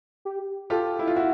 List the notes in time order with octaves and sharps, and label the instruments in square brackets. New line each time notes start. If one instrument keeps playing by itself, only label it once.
[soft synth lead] G4
[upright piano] F4 G4 [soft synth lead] A4
[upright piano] E4
F4
E4 F#4